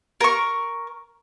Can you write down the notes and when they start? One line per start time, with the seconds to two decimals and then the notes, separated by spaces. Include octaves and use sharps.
0.21 A#4 C#6